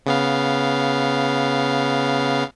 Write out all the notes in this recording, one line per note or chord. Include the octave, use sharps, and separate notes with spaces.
C#3 B3 F5